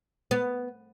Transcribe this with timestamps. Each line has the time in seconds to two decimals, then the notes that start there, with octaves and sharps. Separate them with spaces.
0.31 B3